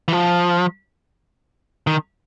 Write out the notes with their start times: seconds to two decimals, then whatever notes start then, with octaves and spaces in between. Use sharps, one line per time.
0.08 E3
0.13 F3
1.87 D#3